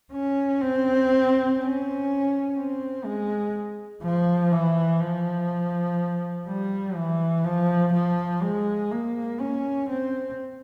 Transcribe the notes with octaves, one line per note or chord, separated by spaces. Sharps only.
C#4
C4
C#4
C4
G#3
F3
E3
F3
G3
E3
F3
F3
G#3
A#3
C#4
C4